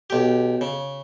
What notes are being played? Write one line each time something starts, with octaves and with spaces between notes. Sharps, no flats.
B1 G4
C#3